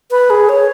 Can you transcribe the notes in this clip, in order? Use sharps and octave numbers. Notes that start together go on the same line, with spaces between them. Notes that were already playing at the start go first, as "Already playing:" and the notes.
B4
G#4
C#5